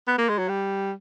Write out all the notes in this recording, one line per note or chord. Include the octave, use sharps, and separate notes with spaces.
B3
A#3
G#3
F#3
G3